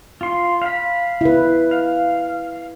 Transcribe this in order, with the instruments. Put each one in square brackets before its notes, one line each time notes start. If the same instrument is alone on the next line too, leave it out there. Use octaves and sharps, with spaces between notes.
[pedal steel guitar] F4 C6
F5 B5
[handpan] E4 B4
[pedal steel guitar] F5